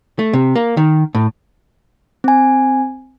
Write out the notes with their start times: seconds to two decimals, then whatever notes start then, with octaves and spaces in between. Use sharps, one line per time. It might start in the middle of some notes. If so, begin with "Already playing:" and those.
0.19 A3
0.33 C3
0.56 A#3
0.77 D#3
1.15 A2
2.24 C4 G#5